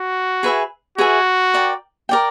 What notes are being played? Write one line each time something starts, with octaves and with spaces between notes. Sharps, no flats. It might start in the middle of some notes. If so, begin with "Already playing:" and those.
Already playing: F#4
G#4 B4 E5 G#5
F#4 G#4 B4 E5 G#5
A#4 D5 G5
A#4 D5 G5